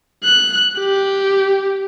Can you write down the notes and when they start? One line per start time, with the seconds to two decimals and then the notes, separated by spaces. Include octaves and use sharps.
0.24 F#6
0.79 G4